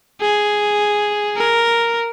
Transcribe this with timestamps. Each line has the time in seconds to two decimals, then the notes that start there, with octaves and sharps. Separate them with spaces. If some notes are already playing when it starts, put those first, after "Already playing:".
0.21 G#4
1.36 A#4